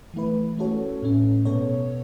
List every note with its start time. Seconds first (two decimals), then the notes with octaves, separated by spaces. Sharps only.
0.14 E3 A3 E4 B4
0.58 A3 C#4 F#4 A4 C#5
1.02 A2 A3 C#4
1.45 B2 B3 A4 C#5